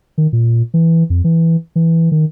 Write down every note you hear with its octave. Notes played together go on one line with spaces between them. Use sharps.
D#3
A#2
E3
F2
E3
E3
D#3